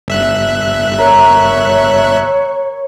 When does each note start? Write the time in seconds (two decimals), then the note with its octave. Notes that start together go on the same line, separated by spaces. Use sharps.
0.08 G1 E5 F#6
0.98 A#4 C#5